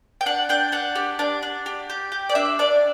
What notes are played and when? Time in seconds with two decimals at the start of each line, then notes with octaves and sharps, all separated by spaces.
0.21 G5
0.26 D4 F#5
0.49 D4 G5
0.72 D4 F#5
0.95 G4
1.19 D4
1.43 D4
1.66 G4
1.90 G4
2.12 G4
2.29 D5
2.35 D4 E5
2.59 D4 D5